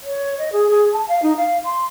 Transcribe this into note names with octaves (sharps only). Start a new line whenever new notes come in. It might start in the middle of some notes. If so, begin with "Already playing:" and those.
C#5
D#5
G#4
G#4
A5
F5
D#4
F5
C6